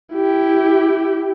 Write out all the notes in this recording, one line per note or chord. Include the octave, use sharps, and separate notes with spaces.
E4 G4